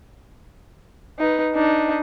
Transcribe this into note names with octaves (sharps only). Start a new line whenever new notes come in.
D#4 B4
D4 D#4